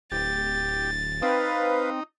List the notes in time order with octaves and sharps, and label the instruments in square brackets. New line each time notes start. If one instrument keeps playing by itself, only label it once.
[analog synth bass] D1 [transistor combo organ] G4 [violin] A6
[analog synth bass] C4 [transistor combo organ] D#4 [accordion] B4 F5